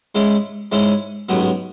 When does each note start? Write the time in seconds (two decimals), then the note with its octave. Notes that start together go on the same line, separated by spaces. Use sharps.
0.15 G#2 G#3 C#4 E4
0.72 G#2 G#3 C#4 E4
1.29 A1 G#2 F#3 B3